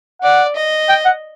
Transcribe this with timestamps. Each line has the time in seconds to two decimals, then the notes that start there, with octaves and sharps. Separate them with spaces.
0.22 D5 F#5
0.55 D#5
0.89 G5
1.05 F#5